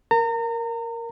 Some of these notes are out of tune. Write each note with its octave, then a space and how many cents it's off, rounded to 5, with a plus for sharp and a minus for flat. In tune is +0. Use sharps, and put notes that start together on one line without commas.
A#4 +0 A#5 -35